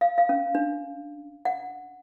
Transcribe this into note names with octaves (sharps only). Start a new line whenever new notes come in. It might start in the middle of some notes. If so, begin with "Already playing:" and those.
F5
F5
C#4
D4
F#5